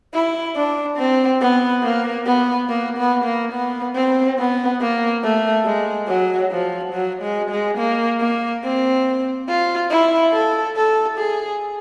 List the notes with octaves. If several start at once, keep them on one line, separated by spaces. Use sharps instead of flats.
E4
D4
C4
B3
A#3
B3
A#3
B3
A#3
B3
C4
B3
A#3
A3
G#3
F#3
F3
F#3
G#3
G#3
A#3
A#3
C4
F4
E4
A4
A4
G#4